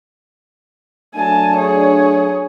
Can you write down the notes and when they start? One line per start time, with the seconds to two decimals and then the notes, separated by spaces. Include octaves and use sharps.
1.15 F#3 A3 D4 G#5 A5
1.58 G#4 C#5